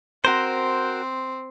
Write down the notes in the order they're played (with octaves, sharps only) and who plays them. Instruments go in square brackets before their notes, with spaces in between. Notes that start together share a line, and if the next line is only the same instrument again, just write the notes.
[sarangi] C4 [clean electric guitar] F#4 A#4 C5